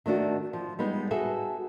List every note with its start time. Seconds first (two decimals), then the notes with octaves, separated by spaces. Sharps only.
0.06 D#3 A3 D4 F#4
0.53 F3
0.79 G3 G#3 B3 D#4
1.11 F#4 G#4 A4 E5